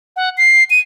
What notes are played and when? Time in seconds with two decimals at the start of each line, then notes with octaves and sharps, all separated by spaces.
0.16 F#5
0.38 C7
0.70 D#7